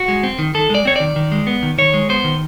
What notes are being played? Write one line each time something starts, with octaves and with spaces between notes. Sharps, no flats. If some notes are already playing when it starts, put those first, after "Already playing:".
Already playing: F#4
G#3
C4
D#3
D#3 A4
G#3 D5
C4 C#5
D#3 D5
D#3
G#3
B3
D#3
D#3 C#5
G#3
B3 C5
D#3